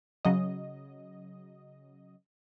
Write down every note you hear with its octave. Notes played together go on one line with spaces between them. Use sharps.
C#3 F#3 D#5